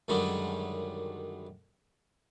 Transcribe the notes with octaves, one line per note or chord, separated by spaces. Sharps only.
F#2 D3 D#3 G3 G#3